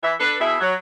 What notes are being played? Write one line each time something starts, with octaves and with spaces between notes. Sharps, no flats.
E3 E5
D4 A4 B4
B2 E4 G#4 E5
F#3